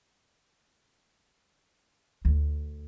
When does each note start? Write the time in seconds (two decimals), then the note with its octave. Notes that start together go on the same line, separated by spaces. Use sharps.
2.25 D2